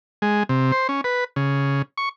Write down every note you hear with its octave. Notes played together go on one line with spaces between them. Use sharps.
G#3
C3
C5
C#4
B4
C#3
C#6